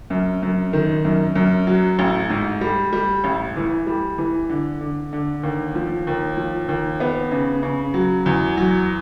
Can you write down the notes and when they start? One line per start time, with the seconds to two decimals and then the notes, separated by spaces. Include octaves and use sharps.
0.10 F#2
0.42 F#2
0.73 D#3
1.05 F#2
1.35 F#2
1.67 F#3
1.99 A1
2.30 G#2
2.61 G3
2.92 G3
3.24 A1
3.56 E3
3.87 G3
4.18 E3
4.49 D3
4.81 D3
5.13 D3
5.43 D#2
5.75 F3
6.07 D#2
6.37 F3
6.68 D#2
7.00 B3
7.32 C#3
7.63 C#3
7.94 F#3
8.26 E2
8.57 F#3